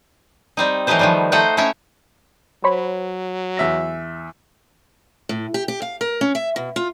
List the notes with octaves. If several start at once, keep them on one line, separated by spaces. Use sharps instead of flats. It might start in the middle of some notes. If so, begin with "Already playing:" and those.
G3 C4 D#4
E3 F#3 A3 D#4 B4 C5
D#3 F3 G3
A3 D#4 C5 F#5 G5
A3 C#4 E4 C#5 E5
F#3 C5 C#5 B5
E2 E5 A#6
A2
G4
G4
F5
A#4
C#4
E5
B2
F4